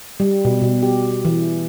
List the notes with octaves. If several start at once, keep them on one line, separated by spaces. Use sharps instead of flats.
G3
B2
B2
G4
E3